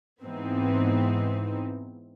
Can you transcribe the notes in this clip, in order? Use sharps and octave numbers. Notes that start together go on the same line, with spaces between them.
G#2 E3 B3 C4 D#4